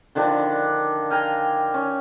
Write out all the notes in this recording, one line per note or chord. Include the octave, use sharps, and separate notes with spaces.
D3 D#3 F3 D4
F5 G5 G#5 A#5
C#4